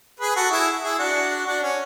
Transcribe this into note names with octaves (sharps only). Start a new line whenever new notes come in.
G#4 B4
F#4 A4
E4 G#4
E4 G#4
D4 F#4
D4 F#4
C#4